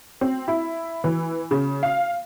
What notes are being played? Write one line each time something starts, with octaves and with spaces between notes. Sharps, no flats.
C4
E4
E3
C#3
F5